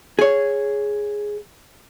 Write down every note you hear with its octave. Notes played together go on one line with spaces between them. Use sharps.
G#4 C#5